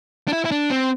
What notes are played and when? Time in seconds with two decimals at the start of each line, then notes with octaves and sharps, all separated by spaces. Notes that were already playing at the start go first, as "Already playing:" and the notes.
0.28 D4
0.33 E4
0.45 E4
0.51 D4
0.71 C4